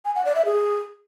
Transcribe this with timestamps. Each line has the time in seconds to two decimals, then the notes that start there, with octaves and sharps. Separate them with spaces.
0.05 G#5
0.15 F#5
0.25 D5
0.35 E5
0.45 G#4